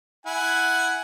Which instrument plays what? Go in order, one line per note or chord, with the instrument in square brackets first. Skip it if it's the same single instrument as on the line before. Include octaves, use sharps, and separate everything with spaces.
[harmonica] E4 F#5 G#5